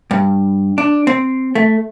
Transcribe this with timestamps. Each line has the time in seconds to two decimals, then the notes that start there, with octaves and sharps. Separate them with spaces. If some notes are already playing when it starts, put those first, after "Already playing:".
0.11 G2
0.78 D4
1.07 C4
1.55 A3